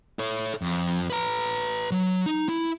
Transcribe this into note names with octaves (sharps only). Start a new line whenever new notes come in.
A4 C#5
F2
B4 A#5
F#3
D#4
E4